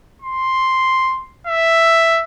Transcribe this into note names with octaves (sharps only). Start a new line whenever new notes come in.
C6
E5